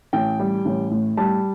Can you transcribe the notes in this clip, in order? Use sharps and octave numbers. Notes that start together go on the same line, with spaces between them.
A1 G5
G3
A1
A2
G3 A5